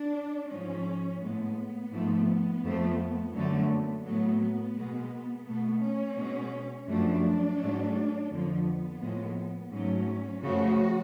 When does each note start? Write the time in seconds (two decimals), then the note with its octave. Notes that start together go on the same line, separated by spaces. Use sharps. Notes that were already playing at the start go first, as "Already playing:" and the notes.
Already playing: D4
0.49 G#2 F3 G#3 C#4
1.20 A2 G#3 B3
1.91 G#2 F3 A3
2.63 F2 F3 A3
3.33 F#2 D3 F#3 A3
4.04 A2 F#3 A3 B3
4.39 B3
4.76 B2 G#3
5.45 B2 A3 B3
5.81 C#4
6.17 B2 G#3
6.87 F#2 F3 A3 D4
7.59 G#2 F#3 A3
8.29 F2 D3 F3 B3
9.01 A2 F3 G#3
9.71 G#2 F#3 A3 C#4
10.42 F#2 C#3 F3 A3 F#4